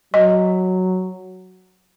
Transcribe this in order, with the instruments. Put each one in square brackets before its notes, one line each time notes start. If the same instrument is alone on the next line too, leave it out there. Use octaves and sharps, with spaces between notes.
[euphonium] F#3 [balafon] D#5